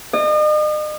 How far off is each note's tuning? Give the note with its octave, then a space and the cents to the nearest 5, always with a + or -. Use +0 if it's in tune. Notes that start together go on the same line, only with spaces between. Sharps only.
D#5 -40